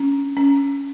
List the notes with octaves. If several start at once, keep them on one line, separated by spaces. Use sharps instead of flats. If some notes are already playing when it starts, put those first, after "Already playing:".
Already playing: C#4
C#4